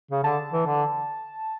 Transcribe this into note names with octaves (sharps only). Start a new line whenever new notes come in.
C#3
D3 A5
E3
D3